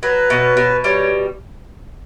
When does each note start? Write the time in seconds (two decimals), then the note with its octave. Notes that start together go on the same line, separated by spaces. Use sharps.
0.03 F#3 B4
0.30 B2
0.57 B2
0.84 G3 C#5